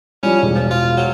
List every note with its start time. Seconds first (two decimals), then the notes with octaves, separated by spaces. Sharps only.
0.23 F3 G3 C#4
0.42 E1
0.55 F3
0.71 F4
0.97 F#3